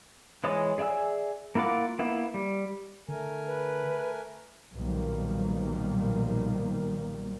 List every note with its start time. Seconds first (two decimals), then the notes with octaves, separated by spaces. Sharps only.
0.44 E3 G#3 C#5 D#6
0.78 G#4 D5 E5 G#5 E6
1.55 A#3 E4 F4 F#5 D6
1.99 A#3 B3 E4
2.34 G3
3.09 D3 A3 A#4 G#5
3.47 B4
4.75 B1 A#2 D#3 F3 G3 A#3